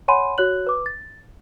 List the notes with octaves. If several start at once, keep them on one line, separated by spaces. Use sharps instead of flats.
C#5 F#5 G#5 B5 C6 D#7
F#4 C#5 F#6 F#7
B4 D6
A6